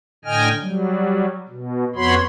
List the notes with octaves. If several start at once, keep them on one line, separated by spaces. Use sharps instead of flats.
A2 D3 D#5 G5 G#5 F6
F#3 G3
B2
F2 B3 F#4 C#5 B5 C6